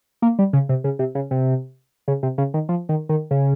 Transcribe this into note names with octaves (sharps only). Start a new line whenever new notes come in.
A#3
G3
C#3
C3
C#3
C3
C#3
C3
C#3
C3
C#3
D#3
F3
D#3
D#3
C#3